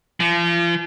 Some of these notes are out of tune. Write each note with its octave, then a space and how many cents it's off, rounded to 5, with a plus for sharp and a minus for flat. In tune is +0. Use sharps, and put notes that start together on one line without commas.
F3 -35